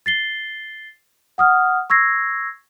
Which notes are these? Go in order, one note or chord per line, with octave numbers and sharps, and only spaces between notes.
A6 C7 G7
F#5 D#6 F6
C#6 E6 G#6 A#6 C7